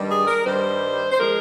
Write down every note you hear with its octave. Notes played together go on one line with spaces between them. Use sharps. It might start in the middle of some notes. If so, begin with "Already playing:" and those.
Already playing: G2 D#3 G3
G#4
A#4
G2 D#3 G3 C5
C5
F3 G#3 A#4